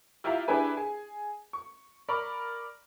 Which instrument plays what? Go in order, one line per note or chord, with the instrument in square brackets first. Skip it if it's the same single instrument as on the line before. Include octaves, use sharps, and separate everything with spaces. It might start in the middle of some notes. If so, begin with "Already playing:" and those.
[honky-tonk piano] E4 F4 G4 E5 F5 A#5
D4 E4 G4 G#4 B4 G#5
G#4
C#6
A#4 D5 B5 C#6 F6